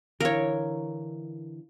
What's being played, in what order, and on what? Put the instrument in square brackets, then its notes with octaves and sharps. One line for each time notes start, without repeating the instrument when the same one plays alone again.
[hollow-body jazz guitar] D3 E3 [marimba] E4 F5 [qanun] A#4 C#5